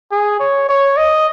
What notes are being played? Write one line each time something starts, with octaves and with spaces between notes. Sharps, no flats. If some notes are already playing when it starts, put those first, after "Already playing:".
G#4
C#5
C#5
D#5